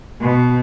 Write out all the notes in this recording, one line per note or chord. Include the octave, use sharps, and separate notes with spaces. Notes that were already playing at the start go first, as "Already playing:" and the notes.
B2